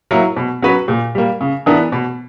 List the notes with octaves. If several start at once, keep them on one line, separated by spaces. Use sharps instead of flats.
F#3 A#3 E4 A#4
B2
F#3 C#4 F#4 B4
A#2
G3 A#3
C#3
E3 B3 D4 A#4
B2